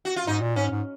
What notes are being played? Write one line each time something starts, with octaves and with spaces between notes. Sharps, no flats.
F#4
F4
G#2 D#4
A#2
G#2 C#4
G#2